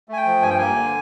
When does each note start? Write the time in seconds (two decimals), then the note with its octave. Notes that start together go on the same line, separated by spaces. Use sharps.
0.09 A3 G#5
0.17 G5
0.26 F3
0.42 G2 G#5
0.50 G5
0.58 A#3 G#5
0.76 D3